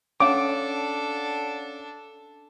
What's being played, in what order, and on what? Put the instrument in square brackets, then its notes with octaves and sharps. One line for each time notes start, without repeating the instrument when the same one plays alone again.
[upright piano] C#4 F5 F#5 [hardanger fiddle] D4 A4 [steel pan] D6